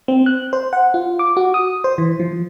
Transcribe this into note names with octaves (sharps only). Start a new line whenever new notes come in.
C4
F#6
C5
F#5
F4
D6
F#4
D#6
C5
E3
F3